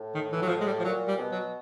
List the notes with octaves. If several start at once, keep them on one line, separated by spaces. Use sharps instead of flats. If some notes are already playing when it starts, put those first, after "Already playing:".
Already playing: A2
D#3
E3
F#3
F3
G#3
G3
F3
A#2 F#3
G3
B2
F#3